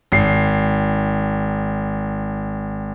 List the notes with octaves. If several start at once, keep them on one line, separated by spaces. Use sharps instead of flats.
G#1 C7